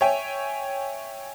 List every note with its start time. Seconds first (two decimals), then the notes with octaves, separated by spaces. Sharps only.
0.01 C#5 E5 G5 G#5